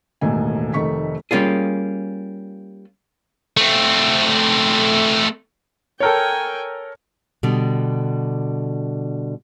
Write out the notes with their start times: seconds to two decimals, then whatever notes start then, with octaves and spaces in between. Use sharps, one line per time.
0.21 E1 D#2 A2 D#3 G#5
0.74 F1 D#3 A3 C#6 B6
1.31 G3 A#3 C#4 F4 G#4
3.57 A3 C4
6.00 A4 A#4 C#5 G5 G#5
7.43 B2 D3 G3